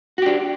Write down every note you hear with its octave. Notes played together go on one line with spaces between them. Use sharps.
D4 F#4 G4